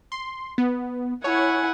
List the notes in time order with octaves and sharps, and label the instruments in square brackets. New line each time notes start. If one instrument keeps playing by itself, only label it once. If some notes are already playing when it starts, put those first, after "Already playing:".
[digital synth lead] C6
B3
[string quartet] E4 F#5 G#5 [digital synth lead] C#5